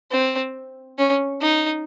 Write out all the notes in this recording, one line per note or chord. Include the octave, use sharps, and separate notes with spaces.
C4
C#4
D#4